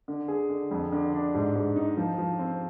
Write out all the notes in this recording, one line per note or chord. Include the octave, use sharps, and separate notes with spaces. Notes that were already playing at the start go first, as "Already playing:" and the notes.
D3
G#4
D3
F2
D3
D4
G#2
G#2
D#4
F3
F3
C4